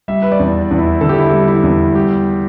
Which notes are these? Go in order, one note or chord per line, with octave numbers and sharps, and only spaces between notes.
G3 E5
B4
D5
E2
E2
E4
D3 A4
G4
E4
G4
G3
E4
E2
G3 G4